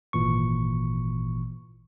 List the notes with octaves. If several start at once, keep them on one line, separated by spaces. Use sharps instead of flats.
G#1 A#2 E3 C#6